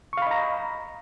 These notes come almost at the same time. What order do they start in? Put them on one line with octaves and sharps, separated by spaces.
C#6 F5 B5 D#5 A#5